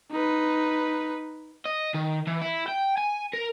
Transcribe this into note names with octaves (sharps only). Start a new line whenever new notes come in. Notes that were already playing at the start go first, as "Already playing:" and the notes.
D#4 B4
D#5
D#3
E3
E4
G5
G#5
A#4